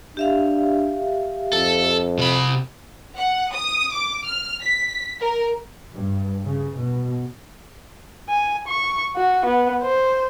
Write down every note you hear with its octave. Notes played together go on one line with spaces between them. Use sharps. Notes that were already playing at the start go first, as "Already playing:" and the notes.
D4 G4 E5 F5
F2 A4
C3 B5
F#5
D#6
D6
F6
B6
A#4
G2
C#3
B2
G#5
C#6
F#4
B3
C5